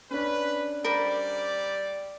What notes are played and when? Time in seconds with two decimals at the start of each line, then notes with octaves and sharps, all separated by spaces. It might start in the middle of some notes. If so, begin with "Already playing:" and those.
0.11 C#4 D4 B4
0.85 G3 A#4 C5 D5 B5